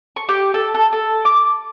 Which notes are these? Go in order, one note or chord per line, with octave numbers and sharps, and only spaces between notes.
C#6
G4
A4
A4
A4
D6